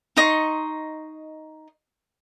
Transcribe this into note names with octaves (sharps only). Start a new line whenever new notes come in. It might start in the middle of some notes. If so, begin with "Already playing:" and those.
D#4 D#5 C6 C#6